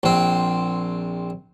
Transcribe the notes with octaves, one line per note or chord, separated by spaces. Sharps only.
A#1 C4